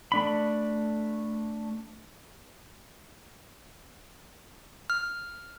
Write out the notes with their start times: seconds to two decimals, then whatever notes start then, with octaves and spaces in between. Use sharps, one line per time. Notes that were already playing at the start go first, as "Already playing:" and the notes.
0.12 A3 D4 B5
4.90 F6